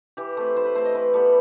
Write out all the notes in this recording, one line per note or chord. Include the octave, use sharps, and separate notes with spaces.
E3 G4
A3 C4 B4
E3 C5
B4
A3 C4 C5
D#5
E3 B4
G3 B3 A4